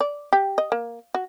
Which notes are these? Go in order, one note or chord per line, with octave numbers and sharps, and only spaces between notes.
D5
G4
D#5
A#3
F#4